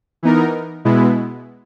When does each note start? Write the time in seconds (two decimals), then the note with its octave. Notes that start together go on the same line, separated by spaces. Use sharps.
0.23 E3 B3 D#4 A#4
0.85 B2 G#3 B3 E4